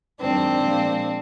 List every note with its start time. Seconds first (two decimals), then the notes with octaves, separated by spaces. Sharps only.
0.20 F#2 D#3 G#3 C4 D4
0.62 A#2 F3 G#3